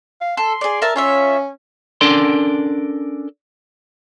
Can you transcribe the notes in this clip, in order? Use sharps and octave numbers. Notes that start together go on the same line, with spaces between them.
F5
A4 C6
G#4 D5
A#4 E5 A5
C#4 F4 C#5 E5
C#4 D4 A4 A#4 D5 C6